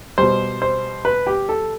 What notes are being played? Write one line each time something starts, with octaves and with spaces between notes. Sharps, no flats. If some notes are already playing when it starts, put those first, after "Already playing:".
B2 G3 C5
C5
B4
G4
A4